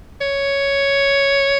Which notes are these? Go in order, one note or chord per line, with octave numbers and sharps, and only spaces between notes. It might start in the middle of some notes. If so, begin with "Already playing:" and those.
C#5